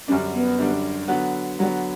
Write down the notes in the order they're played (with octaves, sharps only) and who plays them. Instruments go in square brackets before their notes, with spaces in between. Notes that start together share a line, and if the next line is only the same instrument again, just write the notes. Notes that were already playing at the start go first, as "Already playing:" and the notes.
[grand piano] F#2 D3 G3 D4 [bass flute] C#4
[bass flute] B3
[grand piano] F#2 D3 G3 D4
D3 F#3 B3
[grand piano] D3 F#3 B3 [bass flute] G3